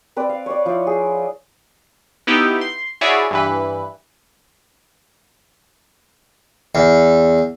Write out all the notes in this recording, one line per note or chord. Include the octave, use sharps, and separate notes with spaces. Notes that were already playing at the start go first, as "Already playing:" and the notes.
C4 B4 D5
F5
C#5 D5
F3 E4
G#4
B3 D#4 E4 G4
C6
E4 F#4 G#4 C#5 D5 E5
G2 E3 B4
E2